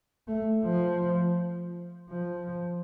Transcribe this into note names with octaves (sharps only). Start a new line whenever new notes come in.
A3
F3
F3